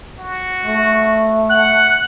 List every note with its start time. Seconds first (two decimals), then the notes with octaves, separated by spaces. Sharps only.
0.19 F#4
0.64 A3
1.49 F#5 F#6